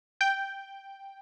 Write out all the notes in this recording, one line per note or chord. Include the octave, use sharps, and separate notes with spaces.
G5 G6